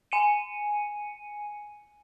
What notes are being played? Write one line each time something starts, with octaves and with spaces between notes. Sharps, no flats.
G#5 C#7 D#7